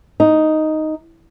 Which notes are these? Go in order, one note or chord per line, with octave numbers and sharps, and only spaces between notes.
D#4